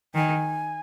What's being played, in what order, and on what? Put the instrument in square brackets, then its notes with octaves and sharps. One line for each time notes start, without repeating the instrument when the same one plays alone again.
[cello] D#3 [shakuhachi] G#5